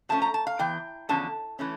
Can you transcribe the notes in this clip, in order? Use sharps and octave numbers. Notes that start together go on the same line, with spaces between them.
C#3 F3 A3 C#4 A5
A#5
A5
F5
E2 E3 G5
E2 D3 F3 C#4 A5
E3 A3 C#4